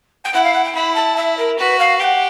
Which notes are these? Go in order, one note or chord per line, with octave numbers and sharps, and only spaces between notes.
G5
E4 F#5
F5
F#5
G5
E4 B5
A5
E5
A#4
F#4 B4
F5
G4 F#5 G5